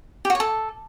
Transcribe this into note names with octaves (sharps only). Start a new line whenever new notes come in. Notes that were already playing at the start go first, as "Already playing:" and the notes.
G4
F#4
C#5
A4